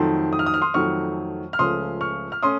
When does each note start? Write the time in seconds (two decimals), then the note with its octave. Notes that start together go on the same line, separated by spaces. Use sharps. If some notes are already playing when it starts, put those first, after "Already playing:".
Already playing: F2 D#3 F#3 A3 A5 C6
0.33 D#6
0.39 F6
0.46 D#6
0.54 F6
0.62 C6 D#6
0.74 F2 D#3 F#3 A3 C#6 F6
1.53 F6
1.59 C#2 C#3 F3 A3 C#4 C6 D#6
2.01 C#6 F6
2.32 F6
2.43 A3 C#4 C6 D#6